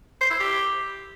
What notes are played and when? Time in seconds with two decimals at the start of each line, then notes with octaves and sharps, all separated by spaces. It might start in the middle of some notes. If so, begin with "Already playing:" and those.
0.21 C5
0.30 E4
0.40 G4